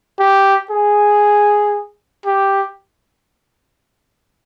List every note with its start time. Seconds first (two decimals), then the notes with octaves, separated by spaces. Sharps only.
0.19 G4
0.71 G#4
2.26 G4